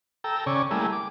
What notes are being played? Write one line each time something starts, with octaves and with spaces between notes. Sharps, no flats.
A4 G5 A#5 E6
C#3 C#4 D5
G3 A3 A#3 E4 G#4
D6